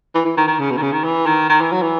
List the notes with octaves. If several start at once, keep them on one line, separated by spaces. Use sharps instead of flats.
E3
E3
D#3
D#3
C#3
B2
D#3
C#3
D#3
E3
D#3
D#3
E3
F#3
E3